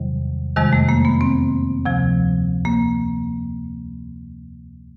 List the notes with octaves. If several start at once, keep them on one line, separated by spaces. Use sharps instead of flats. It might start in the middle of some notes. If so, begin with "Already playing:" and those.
Already playing: E2 C3 D#3 F#3 G3
F2 C3 D#3 G3 G#3
A3
A#3
B3
C4
D2 C3 F3
A#3